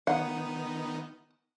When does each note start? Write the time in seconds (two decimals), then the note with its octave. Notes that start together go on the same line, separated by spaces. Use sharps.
0.07 D#3 B3 D#4 F#5